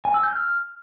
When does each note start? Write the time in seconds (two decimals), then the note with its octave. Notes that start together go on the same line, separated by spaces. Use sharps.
0.05 G#5
0.14 E6
0.23 G6
0.33 F6